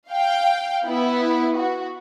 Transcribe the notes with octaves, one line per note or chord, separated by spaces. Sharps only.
F5 G5
B3 E4
F#4